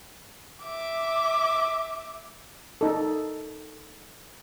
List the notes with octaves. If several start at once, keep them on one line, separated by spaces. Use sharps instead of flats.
E5 D6
D#4 A4